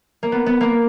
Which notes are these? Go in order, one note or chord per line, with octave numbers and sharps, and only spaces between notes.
A#3
B3
B3
A#3